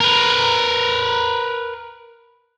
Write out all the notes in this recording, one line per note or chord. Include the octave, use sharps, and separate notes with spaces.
A#4 B4